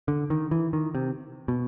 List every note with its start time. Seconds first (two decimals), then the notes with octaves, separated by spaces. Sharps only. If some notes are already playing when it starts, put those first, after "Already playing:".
0.08 D3
0.30 D#3
0.51 E3
0.73 D#3
0.95 C3
1.48 B2